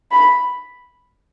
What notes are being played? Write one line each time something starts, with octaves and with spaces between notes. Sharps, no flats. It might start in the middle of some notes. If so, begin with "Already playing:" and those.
B5